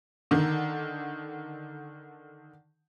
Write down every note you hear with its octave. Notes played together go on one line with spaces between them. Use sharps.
D3 D#3